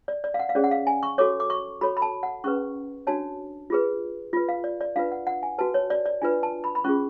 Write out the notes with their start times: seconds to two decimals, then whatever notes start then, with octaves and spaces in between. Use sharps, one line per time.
0.08 D5
0.24 D5
0.34 F5
0.39 F#5
0.49 F5
0.55 C#4 G#4 C#5 D5
0.64 F#5
0.71 F5
0.87 G#5
1.03 C#6
1.18 F#4 A4 C#5 D6
1.40 D6
1.50 C#6
1.81 F#4 A4 C#5 B5
1.97 B5
2.02 A5
2.23 F#5
2.44 C#4 G#4 B4 C#6
3.07 D4 F#4 C#5 A5
3.70 F4 G#4 B4
4.33 F4 B4
4.49 F5
4.64 D5
4.81 D5
4.96 D4 F4 B4 F5
5.12 F#5
5.27 F#5
5.43 G#5
5.58 F#4 B4 A5
5.74 C#5
5.90 D5
6.05 D5
6.22 D4 F4 B4 G#5
6.43 A5
6.64 B5
6.75 B5
6.84 C#4 F4 G#4 C#6